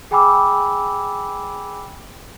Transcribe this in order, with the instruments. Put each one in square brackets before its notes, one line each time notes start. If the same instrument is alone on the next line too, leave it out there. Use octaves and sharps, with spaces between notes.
[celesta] G#4 G5 G#5 B5 D6 E6